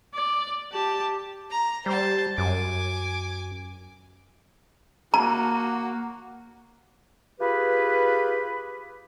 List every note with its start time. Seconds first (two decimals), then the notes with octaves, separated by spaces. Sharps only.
0.14 D5
0.72 G4 A5
1.51 A#5
1.86 G3 C5 A5
2.38 F#2 G#5 D6
5.14 A#3 F#4 A#5
7.39 F4 G4 G#4 B4